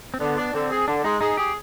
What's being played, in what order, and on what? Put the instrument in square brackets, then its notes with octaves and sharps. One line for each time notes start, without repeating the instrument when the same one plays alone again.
[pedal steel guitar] C4
[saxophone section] D3 [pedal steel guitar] B3
[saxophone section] D4
[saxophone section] D3 [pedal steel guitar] C4
[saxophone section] G#4
[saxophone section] D3 [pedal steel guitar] D4
[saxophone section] G#3 [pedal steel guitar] D#4
[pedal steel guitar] D#4 [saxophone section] G#4
[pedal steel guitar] G4 [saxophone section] G#4